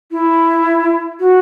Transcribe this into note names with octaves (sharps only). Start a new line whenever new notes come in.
E4
F#4